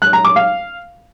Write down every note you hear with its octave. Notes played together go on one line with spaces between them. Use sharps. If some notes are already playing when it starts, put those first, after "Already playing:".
F#6
A#5
D6
F5